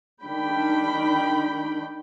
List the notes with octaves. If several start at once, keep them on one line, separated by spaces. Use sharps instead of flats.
D#3 D4 G5 B5